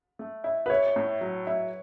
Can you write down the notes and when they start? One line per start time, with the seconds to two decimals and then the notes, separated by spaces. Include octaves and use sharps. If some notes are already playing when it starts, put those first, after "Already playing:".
0.19 A3
0.44 E4
0.66 B4
0.70 E4 C#5
0.96 A2
1.21 F#3
1.47 E4